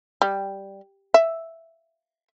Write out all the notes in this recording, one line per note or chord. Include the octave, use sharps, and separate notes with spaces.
G3
E5